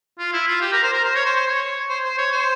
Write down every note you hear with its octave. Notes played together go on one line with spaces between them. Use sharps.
F4
E4
F4
G4
A#4
C5
A#4
C5
C#5
C5
C5
C#5
C5
C5
C#5
C5